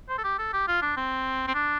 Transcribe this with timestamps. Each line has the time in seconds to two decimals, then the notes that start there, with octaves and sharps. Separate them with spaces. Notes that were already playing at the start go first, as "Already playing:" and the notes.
0.09 C5
0.18 A4
0.24 G4
0.38 A4
0.53 G4
0.68 F4
0.82 D4
0.97 C4
1.47 C4
1.54 D4